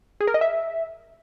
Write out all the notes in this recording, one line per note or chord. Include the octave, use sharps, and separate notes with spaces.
G#4
A#4
D#5
E5